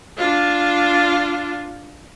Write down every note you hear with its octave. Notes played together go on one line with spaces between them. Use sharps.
D4 F4